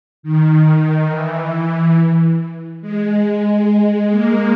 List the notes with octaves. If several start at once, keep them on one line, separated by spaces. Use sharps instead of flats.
D#3
E3
G#3
G#3
A#3